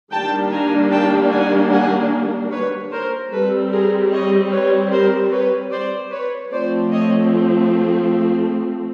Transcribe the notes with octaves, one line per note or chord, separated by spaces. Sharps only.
D#3 G3 A#3 D4 G5 A5
G#5 A#5
G5 A5
F#5 G#5
F#5 G#5
B4 C#5
A#4 C5
G3 C4 A4 B4
G#4 A#4
C#5 D#5
B4 C#5
A#4 C5
B4 C#5
C5 D5
B4 C#5
F3 A3 C4 C5 D5
C#5 D#5